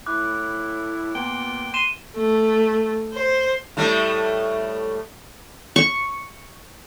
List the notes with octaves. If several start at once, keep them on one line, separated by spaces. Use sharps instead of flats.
A2 E4 D6 F#6
A#2 B3 G5
C6 D#7 E7 G7
A3
C5
A2 G3 A3
C#6